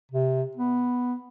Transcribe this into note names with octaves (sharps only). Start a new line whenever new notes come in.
C3
B3